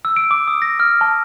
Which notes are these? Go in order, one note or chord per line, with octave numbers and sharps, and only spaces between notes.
E6
D7
D6
D#6
A#6
F6
A5